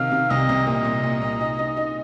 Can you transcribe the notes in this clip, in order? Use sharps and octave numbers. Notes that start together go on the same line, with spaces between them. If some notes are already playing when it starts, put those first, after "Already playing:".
Already playing: C3 D#3 F5
C3
C2 D#5
C2
A#2 D#5
A#2
A#2
A#2
D#4
D#4
D#4